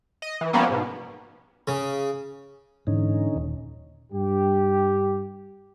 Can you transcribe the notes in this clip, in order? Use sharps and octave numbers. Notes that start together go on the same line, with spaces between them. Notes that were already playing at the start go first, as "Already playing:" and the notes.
D#5
E3
F3 G3 A#3 B3 C#4
G#2 B2
C#3
G#2 D3 E3 C#4 D#4
D#1
G2 G4